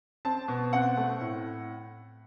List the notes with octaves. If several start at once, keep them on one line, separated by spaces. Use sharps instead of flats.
C4 A5
B2
C4 F#5
A3
A2